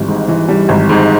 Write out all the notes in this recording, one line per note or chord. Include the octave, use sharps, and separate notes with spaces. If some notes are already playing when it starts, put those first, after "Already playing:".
Already playing: G#1 E3 G3
G#2
E3
G3
G#1
G#2